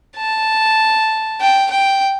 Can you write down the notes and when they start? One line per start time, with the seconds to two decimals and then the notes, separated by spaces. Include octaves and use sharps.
0.17 A5
1.40 G5
1.71 G5